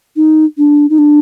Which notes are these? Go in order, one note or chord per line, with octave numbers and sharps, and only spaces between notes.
D#4
D4
D#4
D4